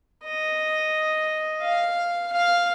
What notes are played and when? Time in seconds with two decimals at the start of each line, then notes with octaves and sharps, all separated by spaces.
0.24 D#5
1.63 F5
2.32 F5